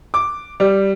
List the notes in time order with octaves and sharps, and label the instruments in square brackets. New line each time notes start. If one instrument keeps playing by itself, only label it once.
[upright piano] D6
G3